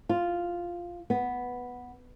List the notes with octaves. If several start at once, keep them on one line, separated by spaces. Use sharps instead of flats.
F4
B3